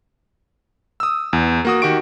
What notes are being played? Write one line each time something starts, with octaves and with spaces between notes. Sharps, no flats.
D#6 E6
E2
A#3 F#4 D#6
D#3 F#4 G4 C#6 D7